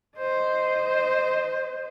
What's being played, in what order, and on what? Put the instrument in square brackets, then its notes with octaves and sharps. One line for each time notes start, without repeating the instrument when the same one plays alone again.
[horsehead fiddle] C5 D#5